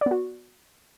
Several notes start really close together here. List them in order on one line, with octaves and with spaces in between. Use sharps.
D5 B3 F#4